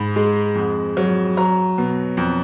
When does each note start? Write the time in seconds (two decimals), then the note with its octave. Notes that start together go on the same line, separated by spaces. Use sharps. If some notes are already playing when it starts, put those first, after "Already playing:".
Already playing: G#2 B5
0.16 G#3
0.55 F2
0.97 F#3
1.37 F#3 A#5
1.78 B2
2.17 F2